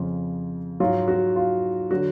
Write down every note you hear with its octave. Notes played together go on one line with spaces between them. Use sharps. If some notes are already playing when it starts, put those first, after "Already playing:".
Already playing: F2 C#3 F3 F4
G#2 F#3 F4
F#4
F4
D3 F#3 F#4